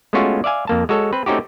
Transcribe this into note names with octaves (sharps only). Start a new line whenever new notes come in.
G#3 A3 B3 C#4 F4 F#4
D5 E5 F5 G#5
F2 A#3 A5
G#3 F#4 A4 C#5
C4 B4
A3 C4 C#4 D#4 F#4 G4